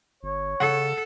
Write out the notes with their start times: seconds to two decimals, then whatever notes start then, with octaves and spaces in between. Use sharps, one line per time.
0.23 G1 C#5
0.60 C#3 A4 F#5